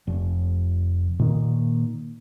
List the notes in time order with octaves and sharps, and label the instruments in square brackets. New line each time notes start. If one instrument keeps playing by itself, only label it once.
[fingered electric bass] F1
A#2 D#3 A#3